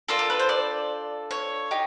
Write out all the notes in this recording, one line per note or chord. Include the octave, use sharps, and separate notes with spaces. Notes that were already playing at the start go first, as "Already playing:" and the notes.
D4 F4 A4 A#4
A#4
B4
C5
D5
C#5
D#4 G4